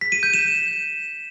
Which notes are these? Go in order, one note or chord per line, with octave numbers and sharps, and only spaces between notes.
B6
D#7
G6
E7